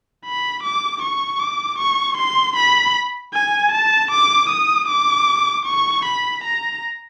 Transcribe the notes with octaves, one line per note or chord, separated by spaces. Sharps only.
B5
D6
C#6
D6
C#6
C6
B5
G#5
A5
D6
D#6
D6
C#6
B5
A#5